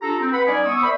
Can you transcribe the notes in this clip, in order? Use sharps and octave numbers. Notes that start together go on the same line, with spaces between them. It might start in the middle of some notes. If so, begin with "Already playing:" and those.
D4 F4 G4 A4 A#5
C4
B4 F#5 B5
G3 C#4 D#4 D5 D#5 G#5
B3 C#6 D#6 E6
A#4 C5 D5 E5 B5